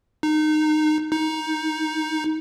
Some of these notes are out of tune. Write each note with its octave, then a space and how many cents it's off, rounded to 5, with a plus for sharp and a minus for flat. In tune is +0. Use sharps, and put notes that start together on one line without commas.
D#4 -20
D#4 +15